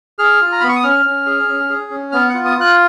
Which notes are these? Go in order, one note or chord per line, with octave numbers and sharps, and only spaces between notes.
G#4 F6
F4
A#5
B3 B5
C#6
D#6
C#4 F6
C#4
G#4
C#4
G#4
C#4
B3 F6
F#5
F4
D#6
F4 F#6